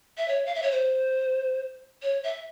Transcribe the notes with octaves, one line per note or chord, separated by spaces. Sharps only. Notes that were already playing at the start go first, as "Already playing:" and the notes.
E5
C#5
F5
E5
C#5
C5
C#5
E5